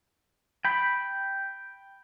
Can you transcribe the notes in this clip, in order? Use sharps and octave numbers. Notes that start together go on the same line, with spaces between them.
G5 B5